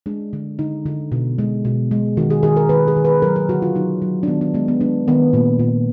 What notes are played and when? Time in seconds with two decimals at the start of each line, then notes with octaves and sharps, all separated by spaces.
0.06 G#3 D4
0.33 D3
0.59 D3 D#4
0.86 D3
1.12 B2
1.39 G#3
1.65 B2
1.91 G#3
2.17 D#3 F#4
2.30 G#4
2.43 D#3 G#4
2.57 A#4
2.69 D#3 B4
2.88 G#4
2.97 D#3
3.05 B4
3.22 F#3 A#4
3.36 A#4
3.49 D3 F#4
3.62 F4
3.75 F#3 D#4
4.02 F#3
4.23 D4
4.28 D#3 B3
4.41 D4
4.54 G#3 B3
4.68 B3
4.81 G#3 D4
5.08 D#3 B3
5.33 A#2 A#3
5.59 A#2